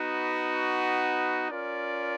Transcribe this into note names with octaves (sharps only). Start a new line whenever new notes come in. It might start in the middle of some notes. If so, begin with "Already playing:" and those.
Already playing: B3 D#4 F#4 B4
C#4 F4 A#4 D5